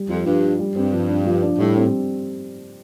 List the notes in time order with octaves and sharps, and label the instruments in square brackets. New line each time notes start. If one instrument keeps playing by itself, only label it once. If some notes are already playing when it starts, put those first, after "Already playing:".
Already playing: [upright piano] G3
[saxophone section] F2 [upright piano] F4
[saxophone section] G2 [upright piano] F3
[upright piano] D4
G3
[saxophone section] G2 [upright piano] C4
[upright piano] F3
D4
F3
D4
[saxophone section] A2 [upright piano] G3
[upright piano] C4